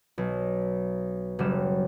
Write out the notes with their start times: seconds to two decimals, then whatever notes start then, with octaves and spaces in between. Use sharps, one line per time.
0.18 B1
1.39 F#1 F#3 G3 E7